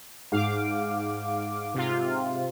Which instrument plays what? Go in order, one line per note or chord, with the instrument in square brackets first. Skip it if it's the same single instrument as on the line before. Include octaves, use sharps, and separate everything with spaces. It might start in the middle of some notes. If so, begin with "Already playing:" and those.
[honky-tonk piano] G#2 [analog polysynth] F5 D6
[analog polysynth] C3 F4